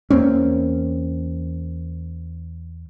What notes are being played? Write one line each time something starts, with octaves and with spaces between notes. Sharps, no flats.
E2 A#3 C4 C#4